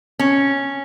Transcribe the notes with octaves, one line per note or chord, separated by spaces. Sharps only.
C#4